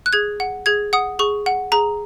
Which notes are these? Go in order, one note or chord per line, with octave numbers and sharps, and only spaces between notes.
F#6
G#4 G#6
F#5
G#4 G#6
F#5 D#6
G#4 C#6
F#5
G#4 A#5